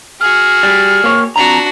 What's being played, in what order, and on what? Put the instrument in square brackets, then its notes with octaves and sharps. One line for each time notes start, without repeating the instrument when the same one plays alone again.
[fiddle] F#4 G#4 [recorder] F6
[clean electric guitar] G3
A#3 C#5
[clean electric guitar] F2 A#5 [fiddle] D4 F#4